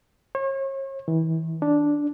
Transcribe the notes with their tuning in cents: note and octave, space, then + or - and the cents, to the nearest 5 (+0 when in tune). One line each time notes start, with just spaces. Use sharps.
C#5 -40
E3 -30
D4 -5